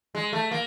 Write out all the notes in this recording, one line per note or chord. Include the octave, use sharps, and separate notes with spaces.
G#3
A3
A#3